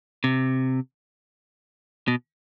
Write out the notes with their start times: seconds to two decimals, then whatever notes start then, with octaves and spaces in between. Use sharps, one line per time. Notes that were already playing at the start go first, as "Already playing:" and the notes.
0.24 C3
2.08 B2